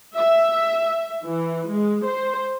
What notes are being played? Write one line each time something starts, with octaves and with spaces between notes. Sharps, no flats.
E5
E3
G#3
C5